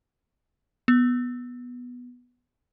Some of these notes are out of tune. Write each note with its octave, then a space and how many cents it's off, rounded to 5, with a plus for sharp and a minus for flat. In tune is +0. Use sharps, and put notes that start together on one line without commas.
B3 -5